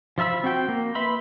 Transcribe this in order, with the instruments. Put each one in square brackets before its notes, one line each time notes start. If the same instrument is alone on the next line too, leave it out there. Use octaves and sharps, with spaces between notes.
[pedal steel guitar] F3 F4 E5 B5 E6
C4 F#4 G5
A#3
B4 E5 B5 C6